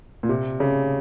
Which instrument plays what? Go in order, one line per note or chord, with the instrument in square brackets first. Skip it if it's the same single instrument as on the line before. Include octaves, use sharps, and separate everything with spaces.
[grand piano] A#2
C3
C#3